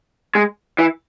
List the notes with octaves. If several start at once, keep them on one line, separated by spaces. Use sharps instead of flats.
G#3
E3